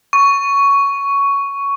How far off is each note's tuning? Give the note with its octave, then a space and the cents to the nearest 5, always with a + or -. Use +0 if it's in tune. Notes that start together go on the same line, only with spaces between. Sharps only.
C#6 +10